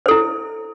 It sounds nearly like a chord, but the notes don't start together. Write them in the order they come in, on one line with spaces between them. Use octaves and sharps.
C5 A4 E4